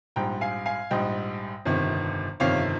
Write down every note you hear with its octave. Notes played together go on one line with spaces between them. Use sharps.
A#1 G#2 G3 G5 A#5
F5 G#5
F5 G#5
A#1 G#2 G3 D#5 G5
G1 F2 C3 D#3
G1 F2 C3 D#3 C#5 F5